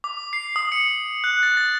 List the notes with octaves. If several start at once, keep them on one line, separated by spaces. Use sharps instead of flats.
D6
C7
D#6
C#7
F#6
A6
A6